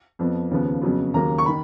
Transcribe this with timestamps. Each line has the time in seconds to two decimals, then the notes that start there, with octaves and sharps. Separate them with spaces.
0.19 F2 F3 B3
0.51 D#2 C#3 F3 B3
0.82 F2 C#3 F#3 B3
1.14 D#2 C#3 F#3 A#3 A#5
1.38 C#6
1.46 D#3 B5